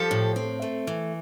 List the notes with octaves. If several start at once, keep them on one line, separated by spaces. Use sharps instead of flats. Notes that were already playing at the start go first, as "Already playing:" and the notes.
Already playing: F3 G4 A4
A2
C4
A3
E3